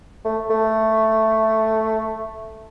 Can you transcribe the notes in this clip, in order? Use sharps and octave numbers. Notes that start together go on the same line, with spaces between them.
A3
A3